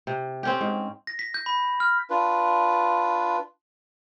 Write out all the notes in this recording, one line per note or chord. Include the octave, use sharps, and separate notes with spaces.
C3
C4 C#4 G4
G#2
A#6
B6
G6
B5
F6
D4 F4 B4